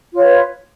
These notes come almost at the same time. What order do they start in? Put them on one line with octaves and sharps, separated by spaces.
F4 C#5 B4